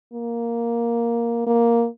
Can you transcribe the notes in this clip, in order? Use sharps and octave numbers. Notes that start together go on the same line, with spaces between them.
A#3
A#3